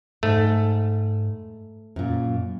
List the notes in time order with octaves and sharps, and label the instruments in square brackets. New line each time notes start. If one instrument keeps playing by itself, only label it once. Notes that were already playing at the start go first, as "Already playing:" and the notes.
[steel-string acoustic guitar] G#2 [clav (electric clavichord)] A3
[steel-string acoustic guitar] F#2 A#2